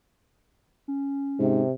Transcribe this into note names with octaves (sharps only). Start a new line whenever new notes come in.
C#4
G#2 C3